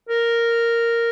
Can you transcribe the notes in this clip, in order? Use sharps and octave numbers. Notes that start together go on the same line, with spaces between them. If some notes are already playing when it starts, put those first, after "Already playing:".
A#4